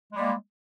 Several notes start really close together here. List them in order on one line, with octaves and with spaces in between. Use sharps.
G#3 G3 A#3